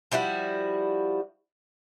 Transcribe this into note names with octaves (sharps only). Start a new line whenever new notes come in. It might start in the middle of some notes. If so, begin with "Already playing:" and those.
F3 G3 E4 F#4